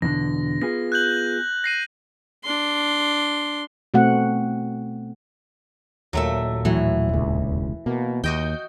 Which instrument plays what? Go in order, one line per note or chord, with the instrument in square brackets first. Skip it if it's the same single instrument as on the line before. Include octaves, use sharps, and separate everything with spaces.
[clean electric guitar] E2 B2 D3 [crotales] A#6
[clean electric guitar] B3 F4 G#4 [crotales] A#6
[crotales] F#6 G6 F#7
A#6 C7 D#7
[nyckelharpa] D4 C6
[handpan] B2 A3 C4 F#4 F#5
[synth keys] D#2 A#2 [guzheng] F#3 A3 E5
[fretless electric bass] A2 F#3 [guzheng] E3
[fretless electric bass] E1 C#2
[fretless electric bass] B2 [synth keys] A#3
[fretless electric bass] D#2 [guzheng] F#4 D#5 G5 [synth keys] G6